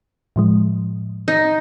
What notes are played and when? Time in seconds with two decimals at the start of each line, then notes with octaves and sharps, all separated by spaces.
0.36 A2 F3 G#3
1.28 D#4